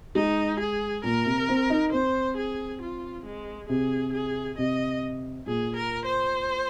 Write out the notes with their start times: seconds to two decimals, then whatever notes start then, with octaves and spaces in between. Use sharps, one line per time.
0.15 G#3 D#4
0.60 G#4
1.04 A#2 A#4
1.25 C3
1.49 C4
1.70 D#4
1.92 C4 C5
2.37 G#4
2.81 F4
3.25 G#3
3.69 C3 G#4
4.13 G#4
4.58 C3 D#5
5.46 A#2 G#4
5.76 A#4
6.05 C5